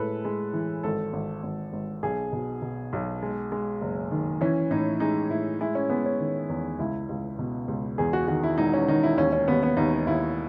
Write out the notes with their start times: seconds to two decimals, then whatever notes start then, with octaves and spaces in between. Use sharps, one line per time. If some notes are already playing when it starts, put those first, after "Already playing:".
Already playing: A2 G#3 A4 B4
0.25 G#3
0.53 E3
0.83 G#1 A4
1.13 G#1
1.43 G#1
1.73 G#1
2.03 B1 G#4
2.33 B2
2.62 B2
2.93 B1
3.22 G#3
3.52 G#3
3.81 F#1
4.11 D#3
4.41 E3 C#4
4.71 A2 D#4
5.00 G#3 D#4
5.30 A2 E4
5.60 G#3 E4
5.75 C#4
5.89 G#3 B3
6.06 C#4
6.20 D#3
6.49 E2
6.79 C#2 E4
7.09 C#2
7.39 B2
7.68 C#2
7.98 E2 G#4
8.13 F#4
8.28 D#3 F#4
8.43 E4
8.58 E1 D#4
8.73 C#4
8.88 D#3 D#4
9.03 E4
9.17 D#2 C#4
9.33 C#4
9.48 D#2 B3
9.63 B3
9.77 D#2 D#4
10.07 D#2 E4